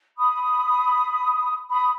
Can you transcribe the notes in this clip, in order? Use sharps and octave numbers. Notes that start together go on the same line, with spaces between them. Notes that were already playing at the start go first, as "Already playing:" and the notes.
B5 D#6
B5 D#6